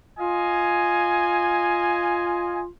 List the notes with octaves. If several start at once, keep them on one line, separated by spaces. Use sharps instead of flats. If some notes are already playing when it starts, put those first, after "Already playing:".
F4 D#5 F5 G#5